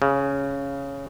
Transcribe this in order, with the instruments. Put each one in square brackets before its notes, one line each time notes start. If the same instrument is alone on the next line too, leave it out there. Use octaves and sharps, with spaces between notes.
[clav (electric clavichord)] C#3